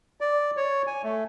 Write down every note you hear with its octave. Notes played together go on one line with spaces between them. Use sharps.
D5
C#5
G#5
A3